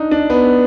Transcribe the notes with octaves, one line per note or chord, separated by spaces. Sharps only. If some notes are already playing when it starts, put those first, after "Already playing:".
Already playing: D4 D#4
D4
B3